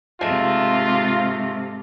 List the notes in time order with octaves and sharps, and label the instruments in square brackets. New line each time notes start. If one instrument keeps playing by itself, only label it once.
[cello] G#2 C3 [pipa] G#3 A3 [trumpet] F4